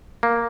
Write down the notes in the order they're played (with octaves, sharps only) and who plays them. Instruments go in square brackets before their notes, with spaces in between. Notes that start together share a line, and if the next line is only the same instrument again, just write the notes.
[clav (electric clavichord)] A#3